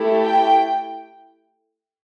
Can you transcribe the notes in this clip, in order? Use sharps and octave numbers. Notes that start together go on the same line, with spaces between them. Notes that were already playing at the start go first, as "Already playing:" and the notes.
Already playing: A3 E4 G4
G5